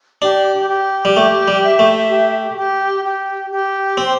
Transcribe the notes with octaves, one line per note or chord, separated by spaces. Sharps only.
D4 G4
G4
G3
A3 G4
G3
E5
A3
G4
G4
G4
G4
C4 C5